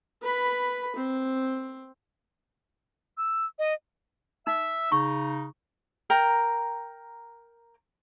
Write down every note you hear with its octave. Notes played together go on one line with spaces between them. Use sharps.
B4 B5
C4
E6
D#5
D#4 E5 E6
C#3 D#4 C#6
A#4 G5 A#5